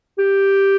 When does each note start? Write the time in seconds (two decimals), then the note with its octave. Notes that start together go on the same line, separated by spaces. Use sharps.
0.19 G4